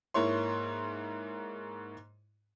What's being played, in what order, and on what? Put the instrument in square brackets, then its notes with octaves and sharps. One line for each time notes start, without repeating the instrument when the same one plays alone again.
[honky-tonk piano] G#2 A#3 E4 C#5 C6